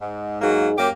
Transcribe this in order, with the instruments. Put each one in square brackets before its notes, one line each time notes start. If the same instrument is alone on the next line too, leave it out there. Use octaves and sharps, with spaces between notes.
[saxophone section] G#2
[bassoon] G#2 [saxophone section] F#3 A#3
[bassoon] F#2 [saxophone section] A#3 G4